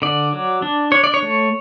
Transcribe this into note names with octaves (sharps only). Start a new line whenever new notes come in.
D3 D5
F#3
D4
D4 C#5
D5
C#5
A3